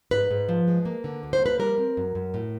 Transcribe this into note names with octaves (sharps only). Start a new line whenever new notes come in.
G#2 B4
G#2
F3
G#3
A#3
D3
D2
C5
A#3 B4
G3 A#4
C4
F#2
F#2
A2